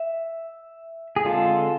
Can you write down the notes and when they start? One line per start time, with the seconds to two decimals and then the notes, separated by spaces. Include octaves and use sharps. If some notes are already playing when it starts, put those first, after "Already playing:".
Already playing: E5
1.16 G#4
1.24 D3 G#3 C4 F4 A4